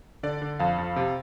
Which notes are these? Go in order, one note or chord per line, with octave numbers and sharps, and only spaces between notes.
D3 D5
D3
F2 F5
F2
C3